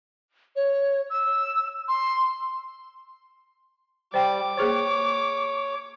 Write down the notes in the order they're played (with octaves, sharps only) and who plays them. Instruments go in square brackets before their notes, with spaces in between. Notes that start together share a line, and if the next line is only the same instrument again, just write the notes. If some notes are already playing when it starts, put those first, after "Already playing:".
[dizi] C#5
E6
C6
[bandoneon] G3 [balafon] C5 G5 [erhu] D6
[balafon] A#3 G#4 C5 [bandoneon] C#5